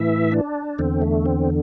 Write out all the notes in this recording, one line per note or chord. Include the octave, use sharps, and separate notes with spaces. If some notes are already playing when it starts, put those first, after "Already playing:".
Already playing: A2 E3 E5
D4
E2 D3 C4
A3
C4